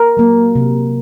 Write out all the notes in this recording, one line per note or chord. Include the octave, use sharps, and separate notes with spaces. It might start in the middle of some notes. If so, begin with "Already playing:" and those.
Already playing: A#4
F#3 A#3
C3